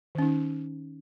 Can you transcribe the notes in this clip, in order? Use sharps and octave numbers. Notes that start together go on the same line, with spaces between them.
D#3 C#4 D#4